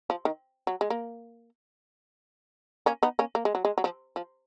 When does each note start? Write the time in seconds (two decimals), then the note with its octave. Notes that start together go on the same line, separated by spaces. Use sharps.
0.10 F3
0.25 D#3
0.67 F#3
0.81 G#3
0.90 A#3
2.86 A#3 C#4
3.03 B3 D#4
3.19 A#3 C#4
3.35 A#3
3.45 G#3
3.55 F#3
3.65 G#3
3.78 F#3
3.84 F3
4.16 F3